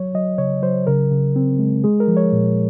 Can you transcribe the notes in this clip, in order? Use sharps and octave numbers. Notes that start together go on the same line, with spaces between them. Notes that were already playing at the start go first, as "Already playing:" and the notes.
Already playing: F#3 C#5
F#3 D#5
C#3 C#5
F#3 C5
C#3 A#4
C#3
C4
G#3
G#3 G#4
A#4
F3
C#5
A#2